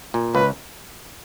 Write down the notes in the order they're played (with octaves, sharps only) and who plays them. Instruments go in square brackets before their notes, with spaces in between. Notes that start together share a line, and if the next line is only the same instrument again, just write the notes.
[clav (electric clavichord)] A#2
[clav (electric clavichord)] C#2 [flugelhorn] B4